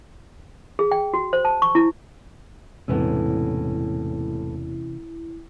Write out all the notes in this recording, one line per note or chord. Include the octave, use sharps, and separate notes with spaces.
G#4
G5
F#4
C5
A5
C#6
E4
E1 A2 C3 E3 B3 C#4 D4 E4